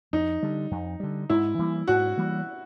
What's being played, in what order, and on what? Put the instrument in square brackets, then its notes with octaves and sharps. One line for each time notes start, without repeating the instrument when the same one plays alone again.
[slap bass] F2 [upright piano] D#4
[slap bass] D3 G3
F2
D3 G3
[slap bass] G#2 [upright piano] E4
[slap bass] E3 G3 A#3
[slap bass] G#2 [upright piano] F#4
[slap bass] E3 G3 A#3